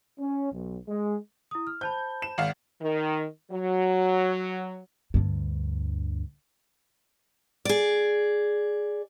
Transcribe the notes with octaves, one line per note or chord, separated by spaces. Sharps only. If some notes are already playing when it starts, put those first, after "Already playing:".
C#4
B1
G#3
E4 D#6
F6
C5 A5 B5 G6
E7
G#1 F5 F#5
D#3
F#3
D2 G2
G#4 D5